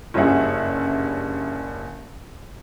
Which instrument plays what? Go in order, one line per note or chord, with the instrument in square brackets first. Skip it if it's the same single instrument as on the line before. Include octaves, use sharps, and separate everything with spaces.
[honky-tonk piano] F#1 G2 C#4 G#4 E5 F#5